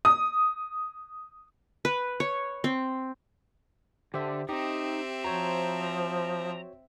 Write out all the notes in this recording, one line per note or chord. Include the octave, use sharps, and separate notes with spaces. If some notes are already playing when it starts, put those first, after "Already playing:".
D#6
B4
C#5
C4
D3 G4 C5 E5
C4 D#4 G4 E5
F3 F#4 C5 C#5 A#5